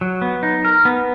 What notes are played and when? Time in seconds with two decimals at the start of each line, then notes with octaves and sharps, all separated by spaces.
0.01 F#3
0.22 B3
0.43 D#4
0.65 A#4
0.85 B3